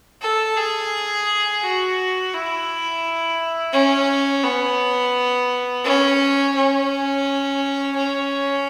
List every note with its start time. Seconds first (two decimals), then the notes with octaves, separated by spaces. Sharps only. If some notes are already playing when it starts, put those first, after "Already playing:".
0.22 A4
0.57 G#4
1.62 F#4
2.33 E4
3.73 C#4
4.44 B3
5.84 C#4
6.56 C#4
7.96 C#4